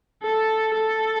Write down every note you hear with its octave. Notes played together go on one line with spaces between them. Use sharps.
A4
A4